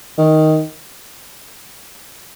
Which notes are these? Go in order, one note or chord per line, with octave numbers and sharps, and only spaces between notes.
D#3